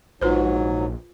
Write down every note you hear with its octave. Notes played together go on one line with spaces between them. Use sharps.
A#1 G#2 F#3 F4 B4 C5